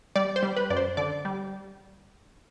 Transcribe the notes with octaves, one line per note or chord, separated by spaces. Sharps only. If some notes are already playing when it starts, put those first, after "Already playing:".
G3 D5
C5
G3
B4
F#2 D5
C5
D3 D5
G3